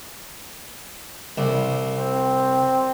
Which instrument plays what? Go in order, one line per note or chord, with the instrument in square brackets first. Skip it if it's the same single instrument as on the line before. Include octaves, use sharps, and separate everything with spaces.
[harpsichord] C2
[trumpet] C4